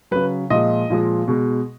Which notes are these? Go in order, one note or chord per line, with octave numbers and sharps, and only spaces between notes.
C#3 F#3 B4
A#2 F3 G#3 D#5
A#2 F3 G#3
B2 G#3